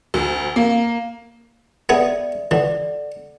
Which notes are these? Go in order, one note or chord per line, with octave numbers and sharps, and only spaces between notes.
D2
A#3
B3 G#4 D5 E5
E3 A4 D5 F#5